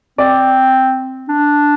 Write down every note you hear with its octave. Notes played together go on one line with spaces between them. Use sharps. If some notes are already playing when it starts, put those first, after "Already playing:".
C4 D5
D4